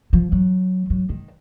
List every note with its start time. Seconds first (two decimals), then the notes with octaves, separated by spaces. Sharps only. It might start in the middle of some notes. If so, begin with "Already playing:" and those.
0.13 F3
0.32 F#3
0.90 F#3
1.10 D#3